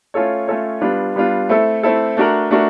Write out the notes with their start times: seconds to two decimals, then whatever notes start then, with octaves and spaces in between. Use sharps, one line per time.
0.14 A3 C#4 F4 A4 C#5
0.48 A3 C#4 F4 A4 C#5
0.81 G3 B3 D4 F4
1.16 G3 B3 D4 F4
1.49 A3 C4 E4 A4
1.83 A3 C4 E4 A4
2.17 A3 D4 F#4 A#4
2.51 A3 D4 F#4 A#4